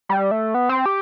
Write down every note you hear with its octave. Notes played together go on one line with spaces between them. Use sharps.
G3
A3
B3
C4
G4